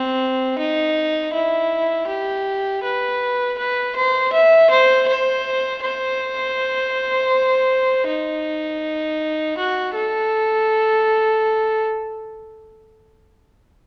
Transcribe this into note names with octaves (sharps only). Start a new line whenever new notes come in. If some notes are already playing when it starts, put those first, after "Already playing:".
Already playing: C4
D#4
E4
G4
B4
B4
C5
E5
C5
C5
C5
D#4
F#4
A4